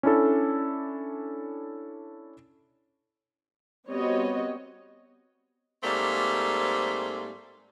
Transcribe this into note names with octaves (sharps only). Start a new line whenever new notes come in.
C#4 D4 E4 A4
G3 B3 C4 F#4 C#5 D#5
G#2 G3 A3 A#3 C4